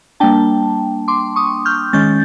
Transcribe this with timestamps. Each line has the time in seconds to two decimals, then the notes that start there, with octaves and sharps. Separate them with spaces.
0.20 G3 A#3 D4 G5 A5
1.08 C6 D6
1.36 C#6 D#6
1.65 F6 G6
1.93 D#3 G#3 C#4 G6 A6